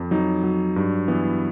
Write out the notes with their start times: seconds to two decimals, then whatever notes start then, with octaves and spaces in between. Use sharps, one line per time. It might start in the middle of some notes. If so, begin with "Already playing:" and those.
Already playing: F2
0.11 F#3 D#4
0.44 F#3
0.76 G2
1.08 E3 B3